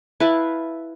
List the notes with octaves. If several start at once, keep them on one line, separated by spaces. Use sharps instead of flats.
E4 B4 F5 A5